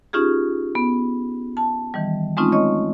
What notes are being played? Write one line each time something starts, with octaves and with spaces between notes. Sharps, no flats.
C#4 D#4 F4 G4 G#4
B3
A5
D#3 E3 G3
G#3 A3 C4 C#4 D#4 F4
C#5 D#5 C#6